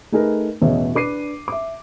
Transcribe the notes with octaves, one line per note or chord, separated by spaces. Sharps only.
A3 D#4 G#4 A#4 B4
A1 E2 B2 C#5 E5
D4 B4 D6 C7 D#7
E5 D6